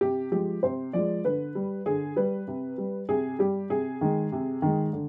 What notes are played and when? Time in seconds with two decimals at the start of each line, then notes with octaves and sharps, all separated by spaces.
0.01 C3 G4
0.31 F3 G#3 G4
0.63 C3 C5
0.93 F3 G#3 D5
1.24 D3 B4
1.55 G3
1.86 D3 G#4
2.16 G3 B4
2.47 C3
2.78 G3
3.09 C3 G#4
3.39 G3 G4
3.70 C3 G#4
4.01 D#3 G#3
4.32 C3
4.62 D#3 G#3
4.93 D3